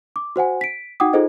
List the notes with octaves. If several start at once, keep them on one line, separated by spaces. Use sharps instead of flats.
D6
F#4 C5 F#5 G#5
B6 D7
D#4 F#4 F#5 G5 D6 D#6
D#4 F4 G#4 A4 C5 D#5